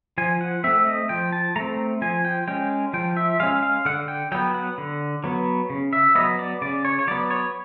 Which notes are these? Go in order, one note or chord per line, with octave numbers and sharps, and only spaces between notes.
F3 G#5
F#5
A3 C4 E5
D#5
F3 G5
A5
A3 C4 A#5
F3 G#5
G5
G#3 C#4 G5
F3 G5
E5
G#3 C#4 F5
F5
D3 F#5
G5
F#3 B3 G5
F#5
D3
F#3 B3
C#3
E5
F#3 B3 D#5
D5
C#3 D5
C#5
C#5
F#3 B3 D5
C#5